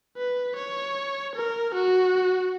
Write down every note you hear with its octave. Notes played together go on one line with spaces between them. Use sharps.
B4
C#5
A#4
F#4